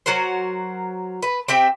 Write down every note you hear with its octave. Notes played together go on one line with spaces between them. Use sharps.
F#3 F#4 A#4 C5
B4
C4 G4 E5 G5